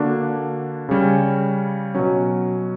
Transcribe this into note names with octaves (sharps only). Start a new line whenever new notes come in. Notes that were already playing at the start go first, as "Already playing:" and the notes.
Already playing: D3 A#3 D4 F#4
C#3 G3 C#4
B2 F#3 C#4